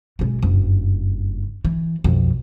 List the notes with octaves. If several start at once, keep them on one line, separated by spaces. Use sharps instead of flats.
B1 G#3
F#1 G2
E3
B1 F2